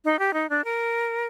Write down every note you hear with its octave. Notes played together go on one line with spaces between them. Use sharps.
D#4
G4
D#4
D4
A#4